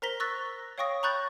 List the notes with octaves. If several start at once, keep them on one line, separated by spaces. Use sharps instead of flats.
A#4 C5 A#5 A#6 B6 G7
C#6 E6 F#6 A6 A#6
C#5 F5 G5 C#6 D#6 A#6
A#5 B5 C#6 F#6 G6 A6